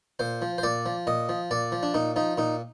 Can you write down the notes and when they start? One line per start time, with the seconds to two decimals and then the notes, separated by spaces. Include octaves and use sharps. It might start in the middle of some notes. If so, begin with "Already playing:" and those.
0.19 A#2 C5
0.42 F3
0.58 C5
0.63 A#2 D5
0.86 F3
1.07 A#2 D#5
1.29 F3
1.51 A#2 D5
1.72 F3
1.83 D4
1.94 A#2 D#4
2.16 F3 D#4
2.38 A#2 D#4